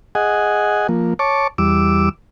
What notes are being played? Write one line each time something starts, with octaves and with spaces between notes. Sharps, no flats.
G#4 D#5 F#5 G#5
F3 A#3
C#5 A5 C#6 D6
E2 G3 D6 E6